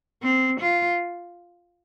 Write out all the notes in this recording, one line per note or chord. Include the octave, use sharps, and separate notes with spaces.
C4
F4